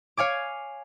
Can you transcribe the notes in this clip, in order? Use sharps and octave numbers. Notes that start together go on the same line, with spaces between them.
C#5 F5 G#5 D6